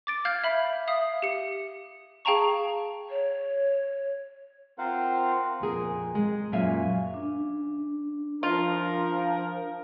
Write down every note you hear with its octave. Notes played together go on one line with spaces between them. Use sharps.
D6 A6 D7
F5 F6 G6 G#6
E5 B5
E5 F5 D#6
G4 C#7
G#4 F5 G5 A5 A#5 C#6
C#5
C4 F4 A#4 C5 F5 F#5
F2 A#2 G#4 A#4
G#3
F#2 A#2 F#3 E5 F5 G#5
D4
F3 F4 A#4